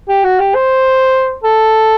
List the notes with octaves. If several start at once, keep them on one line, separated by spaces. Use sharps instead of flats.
G4
F#4
G4
C5
A4